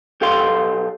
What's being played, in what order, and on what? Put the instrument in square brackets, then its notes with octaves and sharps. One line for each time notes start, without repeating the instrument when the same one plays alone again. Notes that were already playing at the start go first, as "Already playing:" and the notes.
[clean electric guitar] B1 G4 A4 F5 C6